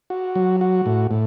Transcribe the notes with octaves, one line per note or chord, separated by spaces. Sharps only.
F#4
F#3
F#4
A2
A2